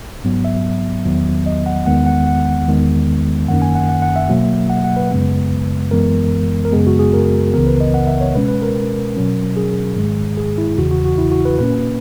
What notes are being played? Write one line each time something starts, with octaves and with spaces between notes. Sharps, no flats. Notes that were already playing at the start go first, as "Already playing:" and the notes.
G#2 F#3 B3
E5
E2 D#3 F#3 B3
D#5
F#5
E2 D#3 G#3 B3 F#5
F#5
F#5
E2 D#3 G#3 B3
F#2 D#3 A#3 C#4 F#5
G#5
F#5
F#5
F#5
E5
B2 F#3 A#3
F#5
F#5
B4
F#2 C#3 G#3 B3
F#2 E3 G#3 B3 A#4
A#4
F#2 C#3 G#3 B3 G#4
F#4
G#4
A#4
C#2 C#3 E3 B3 A#4
B4
D#5
F#5
E5
C#5
B2 G#3 C#4 B4
B4
A#4
B2 F#3 C#4
G#4
G#2 D#3 G#3
G#4
E4
E2 C#3 E3 F#4
F#4
F#4
E4
F#4
B4
A#2 A#3 C#4 B4